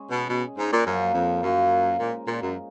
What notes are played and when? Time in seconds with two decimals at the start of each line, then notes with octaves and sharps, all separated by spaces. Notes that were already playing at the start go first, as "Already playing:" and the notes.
Already playing: G#3 C#4 G#4
0.11 B2
0.29 B2 G#3 C#4 G#4
0.58 G#2
0.72 A#2
0.86 F#2 F3 A#3 C#4
1.14 F2
1.43 F#2 F3 A#3 C#4
1.99 A#2 G#3 D#4 A#4
2.28 A#2
2.42 F#2